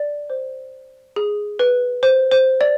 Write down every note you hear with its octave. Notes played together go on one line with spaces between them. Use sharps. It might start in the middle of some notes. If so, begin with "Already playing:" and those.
Already playing: D5
C5
G#4
B4
C5
C5
D5